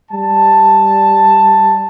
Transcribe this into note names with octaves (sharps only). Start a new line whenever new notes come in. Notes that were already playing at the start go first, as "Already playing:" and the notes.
G3 A5